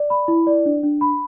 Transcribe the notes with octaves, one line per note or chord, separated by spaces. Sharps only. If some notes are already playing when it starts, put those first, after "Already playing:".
Already playing: D5
B5
E4
D5
D4
D4
B5